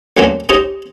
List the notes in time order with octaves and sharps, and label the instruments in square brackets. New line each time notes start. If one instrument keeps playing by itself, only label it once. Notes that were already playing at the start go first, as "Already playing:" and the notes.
[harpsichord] D2 F3 F#3 A#3 C4 C#4
C4 D#4 G4 C#5 D#5